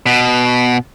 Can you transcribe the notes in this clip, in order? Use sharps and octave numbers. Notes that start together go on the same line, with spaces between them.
B2